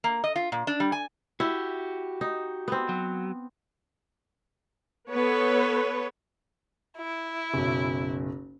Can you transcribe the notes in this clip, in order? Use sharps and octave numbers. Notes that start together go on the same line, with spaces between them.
A#3
D#5
F4
A#2
D4
G3
G#5
E4 F#4 G4
D#4
B3 C4
F#3
B3 A4 B4 C#5
E4
F#1 B1